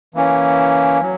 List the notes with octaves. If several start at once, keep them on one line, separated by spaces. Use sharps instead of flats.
E3 A#3 C#4
F#3